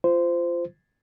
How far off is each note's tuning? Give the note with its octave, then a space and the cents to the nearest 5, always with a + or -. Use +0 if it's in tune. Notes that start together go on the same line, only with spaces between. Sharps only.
F4 -15 C5 -15